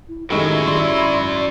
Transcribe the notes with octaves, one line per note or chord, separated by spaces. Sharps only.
E4
F#2 A2 D#3 F#3 G#3 E4 G4
G#1 D5 C6